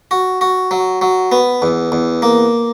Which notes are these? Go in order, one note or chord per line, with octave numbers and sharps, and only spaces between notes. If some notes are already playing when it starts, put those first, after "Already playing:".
F#4
F#4
F#3
F#3
B3
E2
E2
A#3